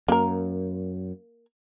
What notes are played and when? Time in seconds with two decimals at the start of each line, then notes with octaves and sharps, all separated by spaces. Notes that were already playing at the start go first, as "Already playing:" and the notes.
0.08 F#2 A#3 A#4